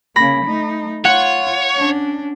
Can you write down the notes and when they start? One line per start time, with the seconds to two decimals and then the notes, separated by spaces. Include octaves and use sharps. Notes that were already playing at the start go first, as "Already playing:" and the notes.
0.16 C#3 A#3 B5 A#6
0.45 A3 D#4
1.05 F4 C#5 F#5
1.75 C#4 D4